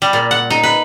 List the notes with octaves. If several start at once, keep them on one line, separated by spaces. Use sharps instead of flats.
G3
A#2
F#5
D#4
B4